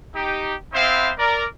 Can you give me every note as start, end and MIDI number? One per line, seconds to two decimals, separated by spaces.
0.15 0.54 63
0.15 0.54 67
0.73 1.12 59
0.73 1.12 60
0.73 1.12 64
0.73 1.12 72
0.73 1.12 76
0.73 1.12 77
1.18 1.46 70
1.18 1.46 74